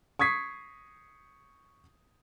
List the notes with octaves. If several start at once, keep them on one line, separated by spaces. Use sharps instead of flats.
C#6 D#6 G#6 B6 C7